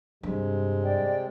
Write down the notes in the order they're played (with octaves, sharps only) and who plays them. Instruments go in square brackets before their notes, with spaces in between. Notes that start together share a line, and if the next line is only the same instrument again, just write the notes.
[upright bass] G2 [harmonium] C3 G#3
[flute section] D5 G5